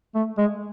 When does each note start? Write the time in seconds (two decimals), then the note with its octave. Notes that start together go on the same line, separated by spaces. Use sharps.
0.15 A3
0.38 G#3